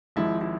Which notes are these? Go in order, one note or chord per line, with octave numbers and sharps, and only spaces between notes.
G#1 G#2 F3 E4
E4